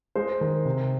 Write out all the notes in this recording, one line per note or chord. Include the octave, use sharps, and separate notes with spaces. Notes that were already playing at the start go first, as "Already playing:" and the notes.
G#3 C5
D#3
C3